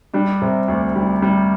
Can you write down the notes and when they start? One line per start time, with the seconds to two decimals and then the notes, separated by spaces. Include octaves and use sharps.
0.14 G3 D4
0.42 C3
0.68 D2
0.96 G3
1.22 G3